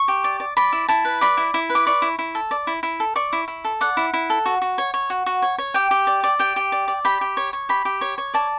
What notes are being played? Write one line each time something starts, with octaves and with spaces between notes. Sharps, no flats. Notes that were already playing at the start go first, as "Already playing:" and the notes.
Already playing: C#6
G4
D5
D5
D5 B5
E4
E4 A5
B4
D5 B5
E4
E4
B4
D6
D5 C#6
E4
E4
A4
D5
E4
E4
A4
D5 C#6
E4
E4
A4
D5 F#5
E4
E4
A4
F#4
F#4
C#5
C#5
F#4
F#4
C#5
C#5
G4 G5
G4
D5
D5
G4 G5
G4
D5
D5
G4 B5
G4
C#5
C#5
G4 B5
G4
C#5
C#5
D5 A5